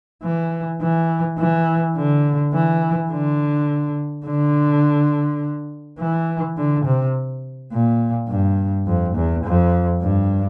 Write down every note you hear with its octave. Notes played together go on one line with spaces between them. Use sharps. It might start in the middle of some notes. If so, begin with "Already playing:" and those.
E3
E3
E3
D3
E3
D3
D3
E3
D3
C3
A#2
G2
F2
E2
F2
G2